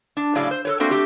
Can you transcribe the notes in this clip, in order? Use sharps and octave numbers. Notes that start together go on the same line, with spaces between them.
D4
A2 C#3 F#3 G#4 D5 F5
C5
A4 B4 C#5
A3 A#3 C4 D4 F#4 A4
A3 C4 G4